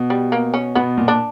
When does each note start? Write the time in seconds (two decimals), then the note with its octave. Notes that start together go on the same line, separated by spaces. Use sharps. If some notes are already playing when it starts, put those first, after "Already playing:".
Already playing: B2
0.10 G3
0.32 A#3
0.54 C#4
0.75 B2 B3
0.97 A#2
1.08 D4